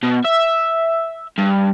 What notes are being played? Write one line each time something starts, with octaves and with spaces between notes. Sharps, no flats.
B2
E5
G2